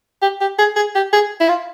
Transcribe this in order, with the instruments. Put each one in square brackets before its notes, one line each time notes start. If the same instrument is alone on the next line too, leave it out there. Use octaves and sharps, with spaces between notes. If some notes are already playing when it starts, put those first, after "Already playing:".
[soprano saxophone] G4
G4
G#4
G#4
G4
G#4
E4
F4